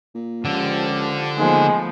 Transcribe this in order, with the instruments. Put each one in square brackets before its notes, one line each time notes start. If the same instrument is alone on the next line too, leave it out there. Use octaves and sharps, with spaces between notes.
[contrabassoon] A#2
[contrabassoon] C#2 [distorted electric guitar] D3 [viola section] F3 G4
[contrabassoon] D#2 [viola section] F3 A3 B3 [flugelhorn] G#3